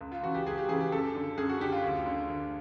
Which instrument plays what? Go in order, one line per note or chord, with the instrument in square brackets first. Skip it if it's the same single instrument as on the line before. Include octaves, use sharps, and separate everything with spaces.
[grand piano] C#2
F4
C#3 E3 F#4
G4
C#2 G#4
G4
C#3 E3 G#4
G4
F#2 A4
D3
F#2 G#4
F#4
D3 G4
F4
D2
D3
D2